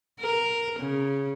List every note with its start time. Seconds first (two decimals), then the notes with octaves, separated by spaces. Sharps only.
0.20 A#4
0.79 C#3